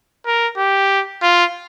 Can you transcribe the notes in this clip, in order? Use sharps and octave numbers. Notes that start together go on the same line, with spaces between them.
A#4
G4
F4